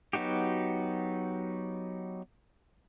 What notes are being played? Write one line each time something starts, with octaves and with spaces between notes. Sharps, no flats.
F#3 B3 D#4 F#4 G4